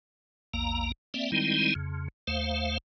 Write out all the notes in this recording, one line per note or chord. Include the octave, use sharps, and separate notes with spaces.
A#1 E2 A#3 A#5
A#3 C4 D5 E5
D#3 G3 G#3 C4 D#4 E4
F2 C#3
D#2 A3 C5 F5